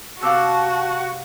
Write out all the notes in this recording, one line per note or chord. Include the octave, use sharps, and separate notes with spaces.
C3 F#4 F5 A5 D6 E6 F#6